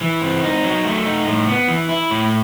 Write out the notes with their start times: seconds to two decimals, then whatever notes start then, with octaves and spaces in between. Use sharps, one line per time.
0.01 E3
0.22 C4
0.42 D#4
0.64 F#3
0.85 A3
1.05 D#4
1.27 A2
1.47 B3
1.68 E3
1.89 E4
2.11 A2